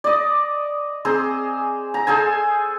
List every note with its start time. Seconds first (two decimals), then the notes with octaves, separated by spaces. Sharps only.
0.04 D5 D#5
1.05 C4 G#4 A#5 C6
1.94 A#5
2.07 G#4 A4 C5 G#5